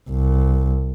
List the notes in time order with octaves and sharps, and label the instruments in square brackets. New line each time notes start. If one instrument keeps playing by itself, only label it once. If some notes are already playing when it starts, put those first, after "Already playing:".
[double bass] C2